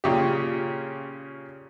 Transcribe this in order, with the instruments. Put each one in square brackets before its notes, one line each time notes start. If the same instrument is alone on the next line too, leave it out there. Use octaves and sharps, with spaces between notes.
[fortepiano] A#2 C#3 G4